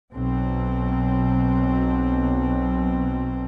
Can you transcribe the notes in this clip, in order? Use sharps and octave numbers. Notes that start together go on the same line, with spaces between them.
B1 B2 F#3 C4